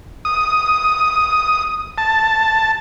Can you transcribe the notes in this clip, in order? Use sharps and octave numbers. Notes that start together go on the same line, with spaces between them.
D#6
A5